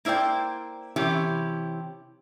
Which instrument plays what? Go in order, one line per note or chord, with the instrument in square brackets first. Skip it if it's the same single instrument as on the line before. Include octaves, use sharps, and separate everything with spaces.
[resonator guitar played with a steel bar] A#3 E4 C5 D5 G5
C3 E3 C#4 E4 G4